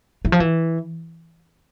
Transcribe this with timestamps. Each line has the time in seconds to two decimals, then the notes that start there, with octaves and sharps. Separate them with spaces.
0.25 E3
0.32 F3
0.40 E3